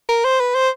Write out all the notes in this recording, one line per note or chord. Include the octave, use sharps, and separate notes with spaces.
A#4
C5
B4
C5